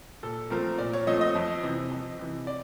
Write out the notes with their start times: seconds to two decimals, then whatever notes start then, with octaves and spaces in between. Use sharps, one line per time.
0.23 A#2 A4
0.50 F3 A3 C4 A#4
0.78 A#2 D5
0.93 C#5
1.07 F3 A3 C4 D#5
1.21 D#5
1.35 F2
1.63 C3 E3
1.91 F2
2.19 C3 E3
2.47 D5